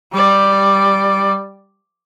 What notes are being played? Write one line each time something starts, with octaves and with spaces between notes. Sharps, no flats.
G3 D5